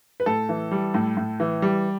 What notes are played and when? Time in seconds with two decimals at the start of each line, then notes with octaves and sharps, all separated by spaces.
0.20 B4
0.26 A2 A4
0.49 E3
0.72 G3
0.94 A2
1.17 A2
1.40 E3
1.62 G3